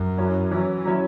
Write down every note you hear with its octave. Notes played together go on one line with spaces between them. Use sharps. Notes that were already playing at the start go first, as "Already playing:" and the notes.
Already playing: F#2
F#3 C#4 E4
E3 F#3 C#4 E4
F#3 C#4 E4